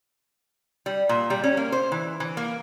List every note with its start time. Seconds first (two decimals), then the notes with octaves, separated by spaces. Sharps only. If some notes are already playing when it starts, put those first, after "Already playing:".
0.86 G3
1.09 A#2
1.30 G3
1.44 C#4
1.57 A#3
1.72 C5
1.92 E3
2.20 E3
2.37 A#3